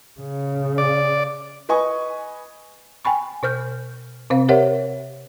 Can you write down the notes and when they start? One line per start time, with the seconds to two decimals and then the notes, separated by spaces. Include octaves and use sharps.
0.21 C#3
0.78 D5
1.69 B4 D#5 G#5 C#6
3.05 G5 G#5 B5 C#6
3.43 B2 C5 F6 G6
4.30 C3 C4 C5 F5
4.49 G4 A#4 C5 C#5 E5 F#5